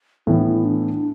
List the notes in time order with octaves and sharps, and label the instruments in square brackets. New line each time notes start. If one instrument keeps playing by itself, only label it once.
[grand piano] A2 E3 B3 [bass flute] E4
[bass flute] D4
E4
D4